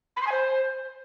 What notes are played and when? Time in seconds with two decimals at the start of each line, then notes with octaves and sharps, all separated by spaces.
0.16 B5
0.22 C6
0.27 G#5
0.32 C5